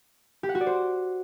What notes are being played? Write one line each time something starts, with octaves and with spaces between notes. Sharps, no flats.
G4
F#5
F#4
D5
C5